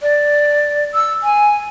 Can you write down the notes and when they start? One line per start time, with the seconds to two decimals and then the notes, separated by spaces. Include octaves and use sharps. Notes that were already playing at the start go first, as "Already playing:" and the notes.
0.01 D5
0.94 E6
1.23 G#5